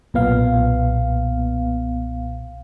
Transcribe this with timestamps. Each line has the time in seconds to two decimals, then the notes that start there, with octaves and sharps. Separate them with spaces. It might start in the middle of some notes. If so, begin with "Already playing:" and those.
0.14 B1 A#2 B3 F5